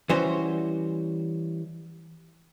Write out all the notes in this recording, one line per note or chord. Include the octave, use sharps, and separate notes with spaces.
E3 G3 C#4 F#4 C5